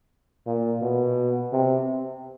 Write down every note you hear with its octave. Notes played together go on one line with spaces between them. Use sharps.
A#2
B2
C3